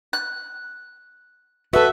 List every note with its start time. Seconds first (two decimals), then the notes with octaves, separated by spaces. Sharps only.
0.13 F#6
1.73 F#4 A4 B4 E5